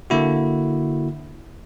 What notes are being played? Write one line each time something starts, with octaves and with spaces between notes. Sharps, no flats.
D3 A#3 E4 F#4